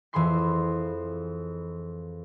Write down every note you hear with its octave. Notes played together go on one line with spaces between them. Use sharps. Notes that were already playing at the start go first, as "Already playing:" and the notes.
F2 E3 G#4 B5 C6 C7